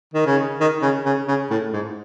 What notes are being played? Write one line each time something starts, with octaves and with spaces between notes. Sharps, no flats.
D#3
C#3
D#3
C#3
C#3
C#3
A2
G#2